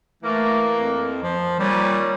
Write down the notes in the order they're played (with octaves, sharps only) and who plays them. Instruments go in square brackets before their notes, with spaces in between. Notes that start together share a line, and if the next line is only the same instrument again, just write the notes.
[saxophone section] E3 A#3 [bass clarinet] A3
[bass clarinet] F2
F3
[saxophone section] A#2 D#3 C#4 [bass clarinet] G3